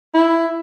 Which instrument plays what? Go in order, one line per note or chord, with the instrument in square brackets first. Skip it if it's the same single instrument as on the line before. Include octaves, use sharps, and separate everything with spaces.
[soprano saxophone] E4